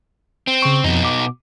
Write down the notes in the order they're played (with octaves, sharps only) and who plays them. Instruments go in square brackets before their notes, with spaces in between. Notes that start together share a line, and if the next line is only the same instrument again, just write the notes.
[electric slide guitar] C4
[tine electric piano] C#3 C#6
[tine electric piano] F2 F3 [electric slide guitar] B2 D#4
[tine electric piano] D6